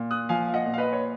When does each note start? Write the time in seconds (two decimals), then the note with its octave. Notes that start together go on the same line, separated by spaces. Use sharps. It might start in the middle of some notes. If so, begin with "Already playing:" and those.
Already playing: A#2
0.11 D#6 F#6
0.29 F3 F5 G#5
0.48 F5
0.54 D#5 F#5
0.65 A#2
0.73 F5
0.78 B4 D#5
0.92 C#5